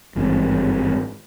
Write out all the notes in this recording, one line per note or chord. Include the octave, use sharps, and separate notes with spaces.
G#1 G2 E3 C4